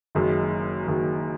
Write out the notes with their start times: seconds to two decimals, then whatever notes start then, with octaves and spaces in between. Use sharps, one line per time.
0.15 F#1 F#2 D#3 G#3
0.87 F#1 F#2 D#3 G#3